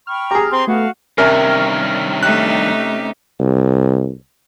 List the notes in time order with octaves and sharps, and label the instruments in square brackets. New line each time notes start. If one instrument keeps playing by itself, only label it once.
[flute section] G5 B5 C#6 [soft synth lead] F6
[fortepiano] G4 G#4 [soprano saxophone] A#5
[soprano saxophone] C4 [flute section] G#5 A#5 C6
[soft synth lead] A3 [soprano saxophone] B3 [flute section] F#4 F5
[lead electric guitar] G2 D#3 [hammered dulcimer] C3 C#4 [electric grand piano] A#4
[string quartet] A3 D#4 G4 [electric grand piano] F#6
[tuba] C2